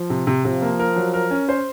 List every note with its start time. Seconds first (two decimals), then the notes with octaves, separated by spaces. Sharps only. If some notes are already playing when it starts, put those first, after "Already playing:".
Already playing: F3
0.10 C3
0.27 C3
0.44 C3 F3
0.62 A#3
0.80 A#4
0.96 F#3
1.14 A#4
1.30 C#4
1.49 C5